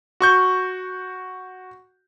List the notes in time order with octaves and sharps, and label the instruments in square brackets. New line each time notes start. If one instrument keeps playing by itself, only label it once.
[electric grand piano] F#4 C#6 G6